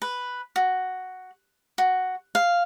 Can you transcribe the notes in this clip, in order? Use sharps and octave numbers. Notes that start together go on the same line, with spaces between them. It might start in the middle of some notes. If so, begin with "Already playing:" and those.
B4
F#4
F#4
F5